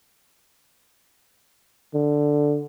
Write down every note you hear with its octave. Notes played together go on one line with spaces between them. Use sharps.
D3